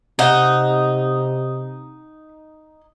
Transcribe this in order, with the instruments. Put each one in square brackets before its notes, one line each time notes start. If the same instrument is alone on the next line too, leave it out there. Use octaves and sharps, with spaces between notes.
[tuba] C3 [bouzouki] D#4 [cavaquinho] E5 F#5 A#5